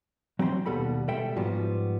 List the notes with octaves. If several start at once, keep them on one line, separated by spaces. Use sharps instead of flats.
F#3 C4 G5 A#5 C6
D#2 B2 G3 A4 B5
B2 G3 G#3 A4 E5 G5
G#2 F3 G3 B3 F#4 G4